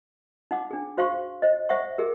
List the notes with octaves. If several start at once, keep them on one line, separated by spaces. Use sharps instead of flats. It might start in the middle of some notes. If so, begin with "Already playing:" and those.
D#4 F#5 D6
D4 G#4
F#4 C5 F5 C6 C#6
C5 D#5
C5 E5 F#5 C#6
G4 G#4 A#4